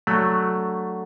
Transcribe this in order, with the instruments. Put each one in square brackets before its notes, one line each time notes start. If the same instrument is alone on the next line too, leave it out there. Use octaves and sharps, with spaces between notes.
[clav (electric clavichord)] F#3 A3 [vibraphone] D4 A4 D5 F#5